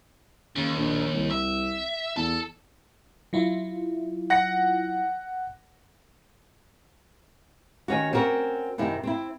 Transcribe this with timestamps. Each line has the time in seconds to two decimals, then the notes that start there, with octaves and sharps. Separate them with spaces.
0.56 D#2 C#3
0.76 A#1
1.14 C2
1.31 E5
2.16 E2 A4
3.33 F#3 E4 F4
4.30 F#5 A#6 C#7
7.88 D#3 C#4 F#4
8.13 C4 C#4 F#4 A#4
8.78 F#2 C3 D#3 E4
9.03 C4 E4